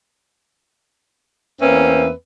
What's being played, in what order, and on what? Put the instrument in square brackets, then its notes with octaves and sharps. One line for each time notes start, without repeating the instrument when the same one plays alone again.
[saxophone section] E2 A#3 C4 C#4 B4 E5